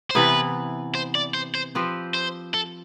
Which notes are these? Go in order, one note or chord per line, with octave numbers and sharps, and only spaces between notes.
C5
C3 E3 B3 E4 B4
C5
D5
C5
C5
F3 C4 G4 B4
C5
A4